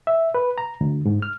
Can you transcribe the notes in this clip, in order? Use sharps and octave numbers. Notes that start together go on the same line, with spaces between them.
E5
B4
A#5
D2
G#2
F6